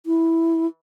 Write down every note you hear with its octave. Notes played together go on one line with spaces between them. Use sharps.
E4